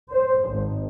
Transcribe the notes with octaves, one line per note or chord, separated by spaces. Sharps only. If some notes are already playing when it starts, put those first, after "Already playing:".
C5
G#1